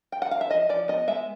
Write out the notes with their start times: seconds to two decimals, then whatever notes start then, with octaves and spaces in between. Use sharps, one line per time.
0.12 G5
0.22 F#5
0.31 F5
0.41 E5
0.50 F3 D#5
0.69 F3 D5
0.88 B3 D#5
1.08 G#3 E5